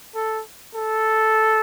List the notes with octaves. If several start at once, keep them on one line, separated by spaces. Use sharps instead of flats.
A4
A4